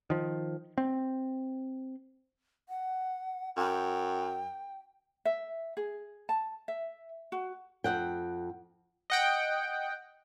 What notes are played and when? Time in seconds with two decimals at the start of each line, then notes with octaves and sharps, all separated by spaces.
0.10 D#3 F3
0.78 C4
2.69 F#5
3.56 F#2 G5
5.25 E5
5.77 G#4
6.29 A5
6.68 E5
7.32 F#4
7.84 F2 G#2 F#5 G5
9.10 D#5 F#5 G5